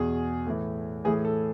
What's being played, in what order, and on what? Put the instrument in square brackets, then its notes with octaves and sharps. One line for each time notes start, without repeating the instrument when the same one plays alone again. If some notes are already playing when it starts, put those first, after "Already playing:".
Already playing: [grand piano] E2 B2 G#4
A2 E3
A2 E3 G#4
A4